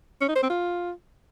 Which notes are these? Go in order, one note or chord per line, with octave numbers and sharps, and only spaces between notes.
C#4
D#4
C5
C4
F4